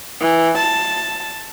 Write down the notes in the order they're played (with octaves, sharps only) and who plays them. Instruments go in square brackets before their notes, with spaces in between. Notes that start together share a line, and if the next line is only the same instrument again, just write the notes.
[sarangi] E3
A5